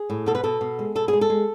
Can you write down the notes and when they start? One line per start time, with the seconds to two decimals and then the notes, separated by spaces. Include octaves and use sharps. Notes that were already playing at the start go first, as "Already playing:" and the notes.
Already playing: G#4
0.10 A2
0.26 B2 A4
0.35 B4
0.44 B2 A4
0.61 B2
0.79 G#3
0.95 B2 A4
1.08 G#4
1.13 G#3
1.21 A4
1.30 G#3